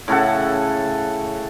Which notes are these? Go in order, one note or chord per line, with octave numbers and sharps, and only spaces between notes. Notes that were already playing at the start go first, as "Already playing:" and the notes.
A2 C#3 A4 F#5